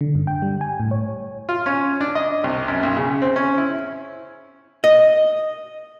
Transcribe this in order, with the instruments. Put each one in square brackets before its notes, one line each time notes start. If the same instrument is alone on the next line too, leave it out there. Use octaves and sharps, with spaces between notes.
[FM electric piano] D3
G2
G5
G3
G#5
A2
C#5
[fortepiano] F4
C#4
D4
D#5
C2
F#2
B1
C#3
C4
C#4
E4
[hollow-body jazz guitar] D#5